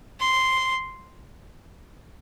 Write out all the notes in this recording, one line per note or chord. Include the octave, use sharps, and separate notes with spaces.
C6